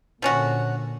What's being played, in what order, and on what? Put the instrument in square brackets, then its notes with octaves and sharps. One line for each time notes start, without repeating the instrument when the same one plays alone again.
[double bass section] A#2 D3 [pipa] F3 C#4 F#4